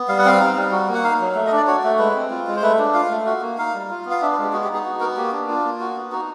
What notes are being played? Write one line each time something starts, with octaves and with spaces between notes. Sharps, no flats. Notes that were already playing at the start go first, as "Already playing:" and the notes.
Already playing: B3
G3 F5
F#5
C4 F5
D#4
G3
F#4
A#3
F#5
D#4 F5
F#3
A3
D#5
D4 D5
F#4 C#5
A3
G#3 B4
C4
F4
G#3
C5
A3 B4
D4
F4 F5
A3
F#4
A#3
D#4 F5
G3
F4
B3
F5
D4 E5
B4
G#3
G4
B3 F#4
G4
D#4 G#4
F#4
B3 A#4
A#3 G4
D4
F4
A#3
F#4
B3
D#4 F#4